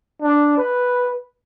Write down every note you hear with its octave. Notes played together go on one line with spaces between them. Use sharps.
D4
B4